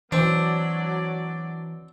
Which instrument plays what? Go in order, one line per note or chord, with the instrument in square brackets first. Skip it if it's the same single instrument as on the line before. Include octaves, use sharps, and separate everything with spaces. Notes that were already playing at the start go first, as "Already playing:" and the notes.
[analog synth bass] E3 [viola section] F#3 D5 [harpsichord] C4 [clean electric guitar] D4